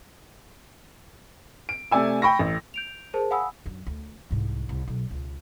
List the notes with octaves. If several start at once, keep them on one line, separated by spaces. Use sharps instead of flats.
D7
C3 A3 D5 G#5 E6
G5 B5 C#6 A#6
A1
G6 D7 F7
G#4 A#4 C5 A5
F5 F#5 G#5 B5 D#6 E6
F#2 D3
D2
C2 G#2
C2
B1
C#2